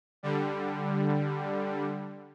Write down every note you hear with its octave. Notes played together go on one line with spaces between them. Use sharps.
D3 G3